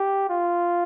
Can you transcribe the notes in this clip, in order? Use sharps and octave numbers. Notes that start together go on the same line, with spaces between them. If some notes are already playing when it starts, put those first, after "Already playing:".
Already playing: G4
F4